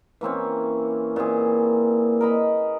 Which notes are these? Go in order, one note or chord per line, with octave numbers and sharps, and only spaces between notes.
E3 A#3 C4 C#4
A#2 E3 C4 G#4
A#4 D#5 B5